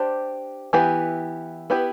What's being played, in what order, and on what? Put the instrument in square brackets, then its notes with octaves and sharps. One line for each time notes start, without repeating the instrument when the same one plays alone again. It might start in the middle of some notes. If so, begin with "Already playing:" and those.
Already playing: [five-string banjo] D4 G4 C5
E3 B3 E4 G4 B4
B3 E4 G4 B4